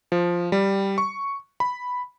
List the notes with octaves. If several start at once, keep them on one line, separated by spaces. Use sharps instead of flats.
F3
G3
C#6
B5